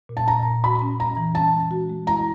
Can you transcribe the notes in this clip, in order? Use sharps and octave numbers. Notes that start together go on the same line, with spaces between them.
A#2
A5
A#2 A#5
A#2
F#4 B5
C#4
C#4 A#5
E3
C#4 A5
G#3
F#4
G#3
E4 A#5